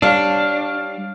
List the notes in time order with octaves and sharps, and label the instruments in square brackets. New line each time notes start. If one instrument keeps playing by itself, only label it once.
[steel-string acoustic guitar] G3 C#5 [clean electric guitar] D4 [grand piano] F5 F6